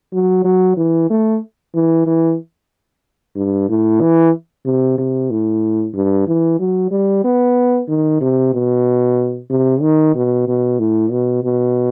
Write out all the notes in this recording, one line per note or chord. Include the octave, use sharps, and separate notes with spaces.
F#3
F#3
E3
A3
E3
E3
G2
A2
E3
C3
C3
A2
G2
E3
F#3
G3
B3
D#3
C3
B2
C3
D#3
B2
B2
A2
B2
B2